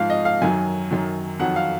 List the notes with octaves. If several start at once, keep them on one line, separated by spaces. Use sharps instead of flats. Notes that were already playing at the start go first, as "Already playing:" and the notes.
Already playing: G#2 F3 F5
D#5
F5
F#2 D#3 F#3 G#5
F#2 D#3 F#3
F2 D#3 F#3 F#5
F5